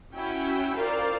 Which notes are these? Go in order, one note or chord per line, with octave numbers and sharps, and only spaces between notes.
C#4 E4 F#4 G5
F4 A#4 C5 D5 F5